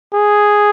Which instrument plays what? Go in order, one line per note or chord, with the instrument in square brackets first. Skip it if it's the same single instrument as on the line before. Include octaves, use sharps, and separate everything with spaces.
[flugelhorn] G#4